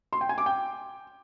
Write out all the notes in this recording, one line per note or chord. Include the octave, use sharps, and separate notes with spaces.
C6
G5
G#5
D6
G5